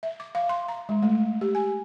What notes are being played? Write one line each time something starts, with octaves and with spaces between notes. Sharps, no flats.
E5
D6
F5
C6
A#5
G#3
A3
G4
G#5